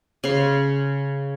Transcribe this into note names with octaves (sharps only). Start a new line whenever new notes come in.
C#3 C6